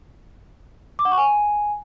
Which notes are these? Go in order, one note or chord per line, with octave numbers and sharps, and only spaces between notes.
D6
F#5
C#6
G#5